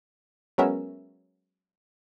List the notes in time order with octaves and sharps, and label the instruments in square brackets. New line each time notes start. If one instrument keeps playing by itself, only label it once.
[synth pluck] F#3 G#3 B3 C#4 A#4 E5